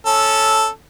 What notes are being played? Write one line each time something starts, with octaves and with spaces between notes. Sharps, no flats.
C#4 A4